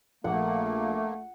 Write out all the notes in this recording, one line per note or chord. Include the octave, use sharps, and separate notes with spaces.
A#1 A3 A#3 F#5